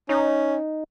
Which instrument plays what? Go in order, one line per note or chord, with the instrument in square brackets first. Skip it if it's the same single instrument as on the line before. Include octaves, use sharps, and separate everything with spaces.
[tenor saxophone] C#4 [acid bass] D#4